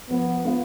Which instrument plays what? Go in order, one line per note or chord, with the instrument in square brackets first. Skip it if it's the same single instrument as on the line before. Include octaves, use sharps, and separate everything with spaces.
[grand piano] F3 [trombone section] B3
[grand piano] B3 F4